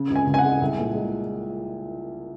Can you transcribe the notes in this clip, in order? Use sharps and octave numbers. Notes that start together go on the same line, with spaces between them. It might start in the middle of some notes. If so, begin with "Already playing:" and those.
Already playing: C#3
C#2
G#5
C#2
G#5
F#5
G#3
C2
A#2
G#3